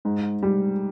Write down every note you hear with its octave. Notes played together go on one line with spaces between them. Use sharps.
G#2
G3